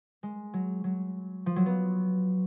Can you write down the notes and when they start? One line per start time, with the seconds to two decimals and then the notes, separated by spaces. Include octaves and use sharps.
0.23 G#3
0.54 F#3
0.84 F#3
1.46 F3
1.56 F#3
1.66 B3